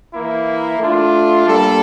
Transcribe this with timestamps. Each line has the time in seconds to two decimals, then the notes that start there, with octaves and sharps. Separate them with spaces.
0.13 E3 A#3 E4
0.79 A3 D4 F4
1.46 G3 A#3 D4 A4